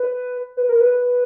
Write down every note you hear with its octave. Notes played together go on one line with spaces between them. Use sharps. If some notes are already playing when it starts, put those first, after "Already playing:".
Already playing: B4
B4
A#4
B4